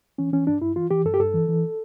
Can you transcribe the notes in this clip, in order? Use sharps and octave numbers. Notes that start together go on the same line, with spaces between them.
E3 C#4
E3 C#4
G2 D4
G2 E4
E3 F4
E3 G4
G2 A4
G4
G2 A4
E3
E3